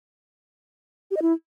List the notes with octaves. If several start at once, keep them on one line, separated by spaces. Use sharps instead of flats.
G4
D#5
E4